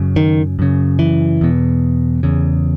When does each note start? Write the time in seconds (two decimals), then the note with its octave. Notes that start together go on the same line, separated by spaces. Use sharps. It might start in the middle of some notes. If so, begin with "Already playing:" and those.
Already playing: F#2 C#3
0.16 D#3
0.59 F#2 C#3
0.99 E3
1.41 E2 B2
2.23 E2 C#3